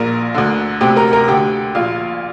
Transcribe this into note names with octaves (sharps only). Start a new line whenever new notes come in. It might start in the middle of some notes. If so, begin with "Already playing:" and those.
Already playing: A#1 A#2 A#4 A#5
D2 D3
D2 C3 G4 G5
A#4 A#5
A#4 A#5
D2 D3 G4 G5
A#1 A#2 F4 F5